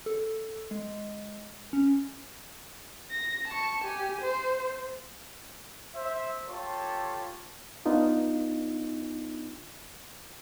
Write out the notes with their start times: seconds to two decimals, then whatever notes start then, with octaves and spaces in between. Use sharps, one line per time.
0.06 A4
0.71 G#3
1.73 C#4
3.11 A#6
3.48 A5 C#6
3.84 G4 G#5
4.21 C5
5.95 C5 E5
6.48 F4 G4 A4 C#5
7.86 B3 D4 D#4 F4